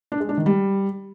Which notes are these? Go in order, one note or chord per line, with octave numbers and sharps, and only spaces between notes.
D4
G#3
D4
D#3
G3